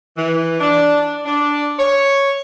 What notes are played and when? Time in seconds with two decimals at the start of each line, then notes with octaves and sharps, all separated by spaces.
0.18 E3
0.61 D4
1.26 D4
1.79 C#5